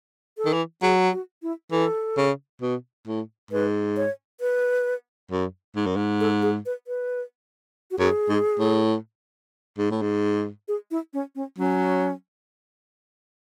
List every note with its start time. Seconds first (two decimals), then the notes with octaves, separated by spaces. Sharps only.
0.38 A4
0.45 D#3
0.53 E3
0.82 F#3 G#4
1.12 F#4
1.42 E4
1.72 E3 A4
2.17 C#3
2.61 B2
3.07 A2
3.51 G#2 B4
3.97 C#5
4.41 B4
5.31 F#2
5.76 G#2
5.86 F#2
5.96 G#2
6.20 A4
6.42 G#4
6.66 B4
6.87 B4
7.91 F#4
7.99 F#2 G#4
8.29 G#2
8.59 A2
9.78 G#2
9.91 A2
10.02 G#2
10.68 G#4
10.91 E4
11.13 C#4
11.35 C#4
11.58 F#3 C#4